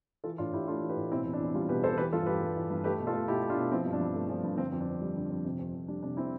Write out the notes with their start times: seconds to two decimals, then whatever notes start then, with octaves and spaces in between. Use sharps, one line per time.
0.24 E3 F4 A4
0.38 A2 D4 F4
0.53 A2 E4 G4
0.67 A3 D4 F4
0.81 E3
0.89 G4 B4
0.96 A2
1.11 B2 C4 E4
1.25 E2
1.33 D4
1.40 E2
1.54 G3 D4 F4
1.69 B2 G4 B4
1.83 E2 A4 C5
1.97 E3 G4 B4
2.13 G2 F4 A4
2.26 G2 G4 B4
2.41 G3
2.56 E3
2.70 G2
2.84 A3 G4 B4
2.99 B2
3.07 F4 A4
3.13 A3
3.28 B2 E4 G4
3.42 A3
3.50 D4 F4
3.57 B2
3.71 F3 C4 E4
3.86 G2
3.93 D4
4.01 G2
4.15 A3
4.29 F3
4.43 G2
4.58 D3 C4
4.72 F2
4.80 D4
4.87 F2
5.02 G3
5.16 D3
5.30 F2
5.45 C3
5.59 F2
5.74 F2
5.88 G3 D4
6.03 C3 D4
6.17 C4 E4